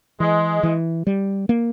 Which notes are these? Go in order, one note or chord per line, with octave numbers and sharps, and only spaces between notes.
E3 G#3
E3
G3
A#3